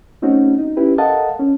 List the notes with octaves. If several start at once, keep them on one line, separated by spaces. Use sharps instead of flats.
A3 C4 C#4 D#4 F#4
D#4
C#4 E4 G4 B4
A4 A#4 D#5 F5 F#5 A5
C#4